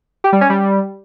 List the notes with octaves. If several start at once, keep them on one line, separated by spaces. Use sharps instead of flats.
G4
G3
C#4
G3